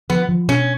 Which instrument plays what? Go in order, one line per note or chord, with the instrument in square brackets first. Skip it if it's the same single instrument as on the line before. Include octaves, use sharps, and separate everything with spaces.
[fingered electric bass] F3 [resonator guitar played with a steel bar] B3
[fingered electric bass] F3
[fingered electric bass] B2 [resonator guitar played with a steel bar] C#4